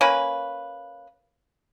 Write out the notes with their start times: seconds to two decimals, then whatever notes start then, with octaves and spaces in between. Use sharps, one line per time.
0.01 A#3 C#4 B4